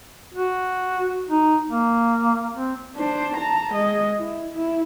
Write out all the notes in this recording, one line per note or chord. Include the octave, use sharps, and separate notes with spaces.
F#4
D#4
A#3
C4
D4 C5
A5 A#5
G#3 D#5
E4
E4